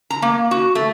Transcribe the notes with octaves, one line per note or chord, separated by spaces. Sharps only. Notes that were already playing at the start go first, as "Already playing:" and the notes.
A#5
A#3
F#4
A3